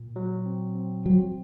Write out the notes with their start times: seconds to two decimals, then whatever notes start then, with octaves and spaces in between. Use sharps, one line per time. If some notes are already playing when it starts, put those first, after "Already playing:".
Already playing: A#2
0.16 F#3
0.46 C4
0.75 C4
1.05 F#3 C4